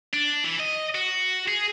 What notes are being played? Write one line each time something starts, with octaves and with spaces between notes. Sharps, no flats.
D4
E3
D#5
F#4
G#4